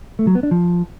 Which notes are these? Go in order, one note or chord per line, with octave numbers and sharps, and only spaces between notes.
A3
F#3
B3
D4
F3